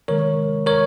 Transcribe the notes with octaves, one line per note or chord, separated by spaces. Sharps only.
C3 D#3 G#3 A#4 C#5
A#4 C#5